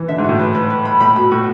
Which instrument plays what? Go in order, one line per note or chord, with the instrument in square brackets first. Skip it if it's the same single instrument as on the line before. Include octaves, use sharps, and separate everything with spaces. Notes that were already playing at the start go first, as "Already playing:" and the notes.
Already playing: [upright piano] E3
[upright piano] D3 [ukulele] E5
[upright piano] G#2
[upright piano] A2 [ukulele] F#4
[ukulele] B4
B4
B4
B5
[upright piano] A2 [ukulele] B5
[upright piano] B2 [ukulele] B5
[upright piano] A2 [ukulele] F#4